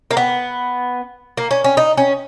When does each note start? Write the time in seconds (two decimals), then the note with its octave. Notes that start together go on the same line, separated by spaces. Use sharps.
0.11 A#3
0.17 B3
1.37 A#3
1.51 C#4
1.64 C#4
1.77 D#4
1.97 C#4